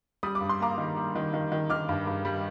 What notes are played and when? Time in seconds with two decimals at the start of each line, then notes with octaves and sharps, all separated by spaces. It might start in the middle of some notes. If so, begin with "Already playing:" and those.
0.23 G3 D#6
0.35 D6
0.41 G2
0.49 C6
0.60 A#3 A#5 D6
0.78 D#3
0.96 G3
1.15 D#3
1.34 D#3
1.52 D#3
1.70 D#3 D6 F6
1.89 G2
2.07 G2
2.25 G3